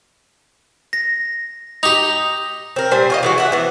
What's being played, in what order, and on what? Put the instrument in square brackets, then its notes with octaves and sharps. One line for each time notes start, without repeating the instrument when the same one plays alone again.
[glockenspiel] A#6
[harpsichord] D#4 G4 [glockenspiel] F7
[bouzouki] C4 A#4
A#2 G3 C5 G#5
F4 C#5 D#5
E3 G#3 F#4
E5 F#5
E3 B3